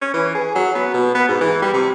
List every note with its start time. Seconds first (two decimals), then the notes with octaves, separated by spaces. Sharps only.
0.02 C#4
0.14 E3
0.34 G#4
0.55 F#3
0.75 B3
0.94 B2
1.15 B3
1.28 G#2
1.41 E3
1.62 G3
1.74 C3